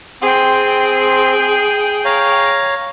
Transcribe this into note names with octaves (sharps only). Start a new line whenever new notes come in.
C4 G#4 G5 C6
C#5 F5 A#5